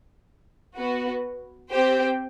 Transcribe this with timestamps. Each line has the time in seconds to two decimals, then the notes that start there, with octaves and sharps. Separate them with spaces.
0.77 B3 F#4 B4
1.71 C4 G4 C5 G5